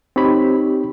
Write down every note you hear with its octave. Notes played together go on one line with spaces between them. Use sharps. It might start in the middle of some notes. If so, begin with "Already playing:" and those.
C4 D#4 G4 C#5 B5